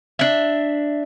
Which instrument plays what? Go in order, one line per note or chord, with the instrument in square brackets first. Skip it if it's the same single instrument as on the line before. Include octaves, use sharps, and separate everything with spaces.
[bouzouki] D4 E5